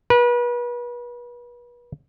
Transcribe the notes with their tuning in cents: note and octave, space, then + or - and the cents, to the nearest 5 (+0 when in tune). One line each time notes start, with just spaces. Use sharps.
B4 -35